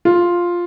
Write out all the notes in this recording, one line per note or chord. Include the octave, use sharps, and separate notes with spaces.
F4